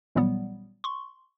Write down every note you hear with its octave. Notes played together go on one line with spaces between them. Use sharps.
A1 A#2 F#3 G3 B3
C6 C#6